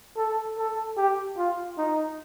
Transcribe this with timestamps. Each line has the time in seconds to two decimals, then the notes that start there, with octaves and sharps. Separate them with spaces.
0.17 A4
0.58 A4
0.97 G4
1.38 F4
1.78 D#4